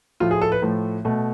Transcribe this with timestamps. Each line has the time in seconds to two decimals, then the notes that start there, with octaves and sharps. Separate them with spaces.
0.20 A2 F3 A3 F4
0.31 G#4
0.41 A4
0.52 B4
0.62 A2 F3 A3
1.05 B2 A3